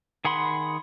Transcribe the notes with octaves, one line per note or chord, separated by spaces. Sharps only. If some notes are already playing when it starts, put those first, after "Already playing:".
D#3 G#4 F#5 B5 C6